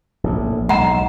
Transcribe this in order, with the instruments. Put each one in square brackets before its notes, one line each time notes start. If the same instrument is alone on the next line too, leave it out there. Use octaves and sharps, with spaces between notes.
[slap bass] A#1 A2
[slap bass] B1 G#3 [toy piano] F#5 A#5